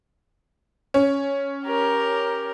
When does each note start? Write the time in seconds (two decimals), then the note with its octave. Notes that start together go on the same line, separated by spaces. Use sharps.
0.94 C#4
1.66 G4 A#4